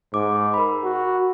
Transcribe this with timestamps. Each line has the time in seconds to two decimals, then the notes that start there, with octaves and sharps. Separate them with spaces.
0.14 G#2 D6
0.54 A#4 B5
0.84 F#4